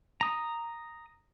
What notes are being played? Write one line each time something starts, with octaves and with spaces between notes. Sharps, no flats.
A#5 D#6